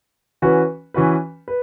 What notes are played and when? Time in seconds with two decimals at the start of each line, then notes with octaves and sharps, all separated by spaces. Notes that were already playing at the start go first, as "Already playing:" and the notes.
0.42 E3 C#4 F#4 B4
0.94 E3 C#4 F#4 B4
1.48 B4